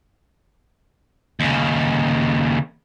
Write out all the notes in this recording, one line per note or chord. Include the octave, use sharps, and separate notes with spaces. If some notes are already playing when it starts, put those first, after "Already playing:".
D#2 C#3